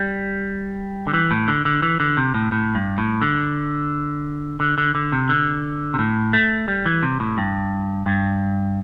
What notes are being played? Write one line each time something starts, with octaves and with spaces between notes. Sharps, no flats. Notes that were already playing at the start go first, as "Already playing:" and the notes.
Already playing: G3
D3
E3
A2
D3
D3
E3
D3
C3
A2
A2
G2
A2
D3
D3
D3
D3
C3
D3
C3
A2
A3
G3
E3
C3
A2
G2
G2